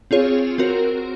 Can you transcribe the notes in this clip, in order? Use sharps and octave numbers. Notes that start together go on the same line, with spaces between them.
C4 F4 G#4 C#5
C4 F#4 A#4